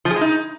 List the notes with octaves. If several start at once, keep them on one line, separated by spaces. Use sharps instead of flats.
F3
G#4
G#3
D#4